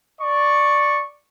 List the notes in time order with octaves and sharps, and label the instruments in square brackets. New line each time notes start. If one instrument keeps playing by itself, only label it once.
[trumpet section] D5 C#6